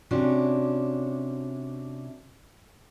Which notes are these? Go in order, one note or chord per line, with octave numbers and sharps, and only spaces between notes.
C3 C#4 D4 F#4